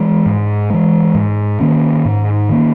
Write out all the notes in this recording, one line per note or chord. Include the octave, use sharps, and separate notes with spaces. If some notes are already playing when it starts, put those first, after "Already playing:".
Already playing: E3 G#3
G#2
E3 G#3
G#2
D#3 A#3 C#4
G#2
D#3 A#3 C#4